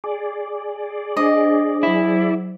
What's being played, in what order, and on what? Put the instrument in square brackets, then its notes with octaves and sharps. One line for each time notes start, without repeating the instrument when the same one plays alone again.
[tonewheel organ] G#4 D5
[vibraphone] D4 C5 [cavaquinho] D#5
[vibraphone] F#3 C5 [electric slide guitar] E4